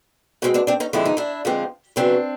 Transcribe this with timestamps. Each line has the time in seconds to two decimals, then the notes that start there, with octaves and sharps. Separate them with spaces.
0.42 B2 G#3 C4 C#4
0.54 C4 D4
0.67 C4 D4
0.80 C#4 D#4
0.93 F2 D3 F3 G#3 C4 E4
1.05 D#4
1.17 D4 E4
1.45 F2 D3 F3 G#3 C4
1.96 E2 C#3 F#3 B3 C4 D4